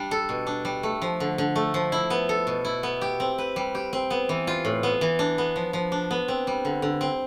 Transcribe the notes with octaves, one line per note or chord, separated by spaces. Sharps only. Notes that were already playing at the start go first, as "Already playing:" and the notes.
Already playing: G3 D4
A4
B2
D4
G3
A3
F3
D3
D3
A3
F3
E4
B3
A4
B2
E4
B3
G4
C4
B4
G3
G4
C4
B3
E3
F4
A2
B3
E3
D4
B3
F3
F3
D4
B3
C4
G3
D3
D3
C4